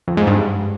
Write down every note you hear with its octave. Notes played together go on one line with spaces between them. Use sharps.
F2
G#2
G2